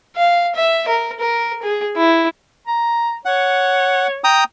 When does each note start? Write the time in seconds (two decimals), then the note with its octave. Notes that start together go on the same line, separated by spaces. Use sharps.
0.16 F5
0.55 E5
0.88 A#4
1.20 A#4
1.63 G#4
1.96 E4
2.67 A#5
3.25 C#5 F#5
4.24 G5 A#5 D#6